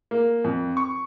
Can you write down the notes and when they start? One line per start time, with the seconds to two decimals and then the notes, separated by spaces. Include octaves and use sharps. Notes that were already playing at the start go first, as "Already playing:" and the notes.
0.11 A#3
0.44 F2
0.77 C#6